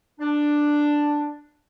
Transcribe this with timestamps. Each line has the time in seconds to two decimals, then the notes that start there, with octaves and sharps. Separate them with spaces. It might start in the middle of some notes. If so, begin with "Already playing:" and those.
0.20 D4